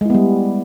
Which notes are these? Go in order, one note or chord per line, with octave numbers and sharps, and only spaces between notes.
G3 G#3 B3 E4